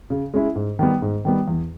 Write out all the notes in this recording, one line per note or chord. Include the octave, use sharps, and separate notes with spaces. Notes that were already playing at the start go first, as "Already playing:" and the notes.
C#3
G#3 C#4 E4
G#2
D#3 G3 B3
G#2
D#3 G3 B3
E2